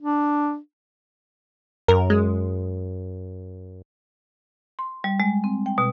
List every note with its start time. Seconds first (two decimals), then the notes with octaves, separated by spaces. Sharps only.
0.01 D4
1.88 F#2 A#4
2.10 G#3
4.79 C6
5.04 G3
5.20 G#3
5.44 C4
5.66 G5
5.78 B2